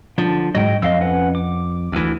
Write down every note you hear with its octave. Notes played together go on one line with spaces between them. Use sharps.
D3 F3 D4
G#2 F#3 D#5 G5
F2 D#5 F5 E6
C#4 B4 F#5
D6
D2 E3